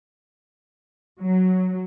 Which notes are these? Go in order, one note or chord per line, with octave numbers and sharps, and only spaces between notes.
F#3